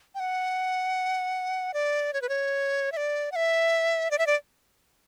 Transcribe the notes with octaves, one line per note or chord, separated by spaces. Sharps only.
G5
F#5
D5
C#5
B4
C#5
E5
D5
F#5
E5
D5
E5
D5